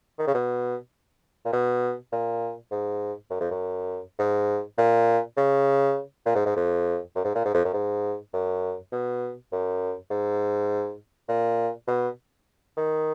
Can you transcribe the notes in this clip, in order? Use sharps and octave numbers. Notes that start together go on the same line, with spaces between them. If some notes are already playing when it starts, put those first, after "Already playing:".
D#3
C#3
B2
A#2
B2
A#2
G#2
F#2
F2
F#2
G#2
A#2
C#3
A#2
G#2
G#2
F2
F#2
G#2
A#2
G#2
F2
F#2
G#2
F#2
B2
F#2
G#2
A#2
B2
D#3